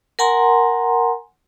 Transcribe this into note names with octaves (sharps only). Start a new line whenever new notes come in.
A#4 F#5 G#5 A#5 C6